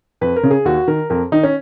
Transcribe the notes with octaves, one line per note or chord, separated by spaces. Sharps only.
F2 B4
A#4
C#3
G#4
D#2 F#4
D#3 A#4
F2 A#4
D#3 D#4
C#4